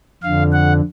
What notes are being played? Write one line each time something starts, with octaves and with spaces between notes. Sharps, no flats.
F2 D3 F5
F#5